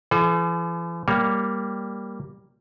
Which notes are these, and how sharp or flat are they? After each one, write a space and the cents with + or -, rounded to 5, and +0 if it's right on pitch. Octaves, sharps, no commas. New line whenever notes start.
E3 +45 A4 -45
G3 +5 A#3 +0 C#5 +0